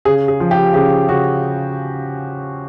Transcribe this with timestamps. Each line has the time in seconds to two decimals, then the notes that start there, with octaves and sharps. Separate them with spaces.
0.05 C#3 G#4
0.28 G#4
0.40 F3
0.51 G4
0.74 C#3 G4
1.09 C#3 F#4